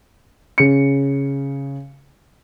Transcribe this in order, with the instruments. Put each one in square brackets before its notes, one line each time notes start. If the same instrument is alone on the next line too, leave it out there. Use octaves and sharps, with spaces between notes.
[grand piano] C#3 C#7